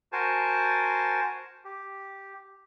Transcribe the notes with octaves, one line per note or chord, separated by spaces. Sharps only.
F#4 A#4 C5 G#5 A5
G4